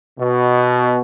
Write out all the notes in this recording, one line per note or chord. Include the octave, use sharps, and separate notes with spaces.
B2